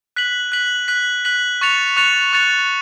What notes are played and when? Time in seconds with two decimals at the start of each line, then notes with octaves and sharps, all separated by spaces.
0.16 F#6 B6 F#7
0.52 F#6 B6 F#7
0.88 F#6 B6 F#7
1.25 F#6 B6 F#7
1.61 C#6 F#6 A6 C#7 F7
1.97 C#6 F#6 A6 C#7 F7
2.33 C#6 F#6 A6 C#7 F7